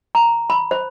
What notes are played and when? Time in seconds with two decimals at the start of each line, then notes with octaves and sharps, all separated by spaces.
0.15 A#5
0.50 B5
0.71 C5